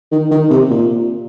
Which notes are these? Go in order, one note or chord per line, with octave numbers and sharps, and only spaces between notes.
D#3
D#3
C3
A#2